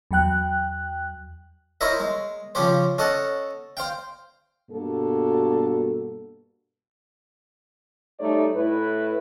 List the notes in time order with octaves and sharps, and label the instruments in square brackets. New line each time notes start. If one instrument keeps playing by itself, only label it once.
[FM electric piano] E2 F#3 G5 F#6
[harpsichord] E4 A#4 C5 C#5 D#5 E5
G#3
C#3 F3 C#4 G4 C5
C#4 A4 D#5 F#5 A5
C5 F5 G5
[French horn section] G2 B2 A#3 F#4 A4
G3 A3 D#4 C#5 D5
A2 E4 B4